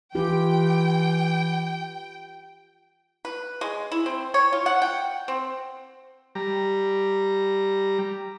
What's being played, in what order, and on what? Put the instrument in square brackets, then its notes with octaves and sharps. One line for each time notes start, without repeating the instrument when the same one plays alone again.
[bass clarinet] E3 [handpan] F4 G4 [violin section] G5
[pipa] B4
G#3
E4
C4
C#5
F4
F#5
G5
C4
[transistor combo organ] G3 A#5